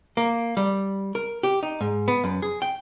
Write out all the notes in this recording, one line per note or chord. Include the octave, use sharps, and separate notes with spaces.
A#3
G3
A#4
G4
D#4
G#2
B3
F#2
G#4
G5